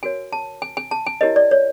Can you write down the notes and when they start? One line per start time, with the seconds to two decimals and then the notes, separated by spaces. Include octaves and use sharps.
0.03 F#4 A#4 C#5 G#5
0.33 A5
0.62 G#5
0.77 G#5
0.91 A5
1.06 G#5
1.21 E4 G4 A#4 C#5 D#5
1.36 D5
1.51 C#5